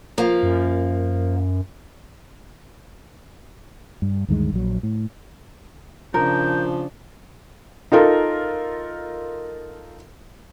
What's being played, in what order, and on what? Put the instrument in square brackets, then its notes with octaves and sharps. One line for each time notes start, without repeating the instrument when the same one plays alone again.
[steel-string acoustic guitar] F3 A#3
[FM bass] F#2
[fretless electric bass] G2
D2 G2 D#3 G#3
A#1 F#3
A2
[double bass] C#3 D4 [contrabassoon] F3 [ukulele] A#4 [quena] G6
[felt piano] D#4 F4 A4 A#4